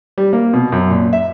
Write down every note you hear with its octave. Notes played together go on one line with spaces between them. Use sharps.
G3
A#3
B2
F#2
A#2
E5